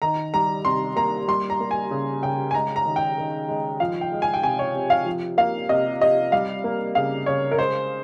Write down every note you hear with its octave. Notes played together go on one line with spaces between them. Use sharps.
D#3 A#5
G3 A#5
C3 C6
A#3 A#5
G3 C6
A#5
A#3
G#5
C#3
C#3 G5
G#5
G#3 A#5
A#5
D#3
G5
D#3
G#3
F3 F5
G5
G#3
G#5
G5
C3 G#5
C#5
C3
F5
F3
A#3 F5
C3 D#5
C3 D#5
G3 F5
A#3
C#3 F5
C#3 C#5
A#4
G#3 C5